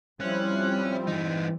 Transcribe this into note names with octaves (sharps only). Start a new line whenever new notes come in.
F3 G3 C4 C#4 E4 C5 F#6
G2 E3 D#4